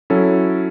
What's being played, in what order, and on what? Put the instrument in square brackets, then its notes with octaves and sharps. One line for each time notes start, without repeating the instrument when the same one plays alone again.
[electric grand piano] F#3 C#4 E4 A4